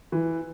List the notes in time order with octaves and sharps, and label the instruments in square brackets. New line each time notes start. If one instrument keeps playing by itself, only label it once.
[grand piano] E3